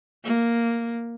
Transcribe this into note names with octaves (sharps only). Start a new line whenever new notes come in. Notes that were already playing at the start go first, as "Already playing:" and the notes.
A#3